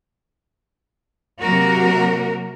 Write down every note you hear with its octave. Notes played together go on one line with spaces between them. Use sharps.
C3 F#3 A#3 F#4 A#4